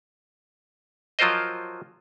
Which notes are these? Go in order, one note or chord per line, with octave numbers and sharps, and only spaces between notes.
F3 F#3 F4 A#4 C5 D#5